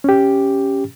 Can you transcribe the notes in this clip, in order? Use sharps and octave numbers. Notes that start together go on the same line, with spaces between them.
C#4 G4